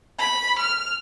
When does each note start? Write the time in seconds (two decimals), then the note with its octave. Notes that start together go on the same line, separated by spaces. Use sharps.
0.19 B5
0.59 F6